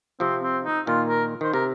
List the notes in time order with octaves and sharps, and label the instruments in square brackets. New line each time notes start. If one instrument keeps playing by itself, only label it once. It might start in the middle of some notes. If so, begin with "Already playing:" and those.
[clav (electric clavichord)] C3 F3 [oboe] C4
[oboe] C4
D#4
[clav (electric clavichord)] A#2 D#3 [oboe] F4
[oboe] A#4
[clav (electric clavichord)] D#3 [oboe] C5
[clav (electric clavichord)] C3 [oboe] A#4